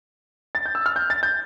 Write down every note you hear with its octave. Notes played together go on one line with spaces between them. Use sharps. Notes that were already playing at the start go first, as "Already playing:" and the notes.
A6
G6
E6
F6
G6
A6
G6